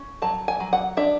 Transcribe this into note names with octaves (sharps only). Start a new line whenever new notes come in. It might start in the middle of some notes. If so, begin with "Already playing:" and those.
Already playing: C#4
F#3 A5
G#5
F#3
F#5
D4 E5